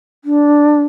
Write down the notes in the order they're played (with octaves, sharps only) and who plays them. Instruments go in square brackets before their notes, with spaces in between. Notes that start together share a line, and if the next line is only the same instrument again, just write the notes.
[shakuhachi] D4